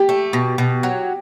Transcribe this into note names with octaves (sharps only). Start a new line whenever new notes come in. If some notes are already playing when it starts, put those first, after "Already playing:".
Already playing: G4
A3
B2
B2
F#3